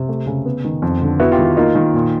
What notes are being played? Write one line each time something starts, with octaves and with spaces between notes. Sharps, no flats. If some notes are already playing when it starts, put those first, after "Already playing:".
Already playing: C3
A3
C#3
B3
D#3
F2
D3
B3 E4 F#4
F4 G4
D#3
A#3 D#4 F4
D#3
A#2